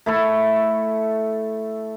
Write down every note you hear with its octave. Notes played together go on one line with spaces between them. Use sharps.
A3 E4 A4